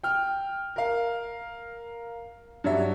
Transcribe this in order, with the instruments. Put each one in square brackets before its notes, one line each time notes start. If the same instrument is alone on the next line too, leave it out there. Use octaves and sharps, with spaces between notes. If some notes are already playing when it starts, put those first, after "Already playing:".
[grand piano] G5 F6
A#4 F5
G2 F#3 F#4 E5